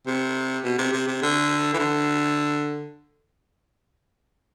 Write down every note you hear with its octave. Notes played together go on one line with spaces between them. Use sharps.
C3
B2
C3
C3
C3
D3
E3
D3